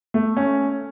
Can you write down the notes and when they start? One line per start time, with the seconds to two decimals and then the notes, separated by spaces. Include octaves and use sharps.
0.14 A3
0.37 C#4